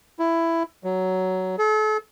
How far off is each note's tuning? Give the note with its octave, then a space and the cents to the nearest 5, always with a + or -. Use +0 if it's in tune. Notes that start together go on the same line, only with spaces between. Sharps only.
E4 +10
F#3 +10
A4 -40